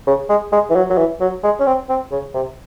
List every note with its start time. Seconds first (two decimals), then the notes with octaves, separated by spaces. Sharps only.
0.07 C#3
0.29 G#3
0.53 G#3
0.70 E3
0.76 F#3
0.90 F#3
0.98 E3
1.21 F#3
1.43 G#3
1.60 C#4
1.66 C4
1.89 C4
2.12 C#3
2.34 C3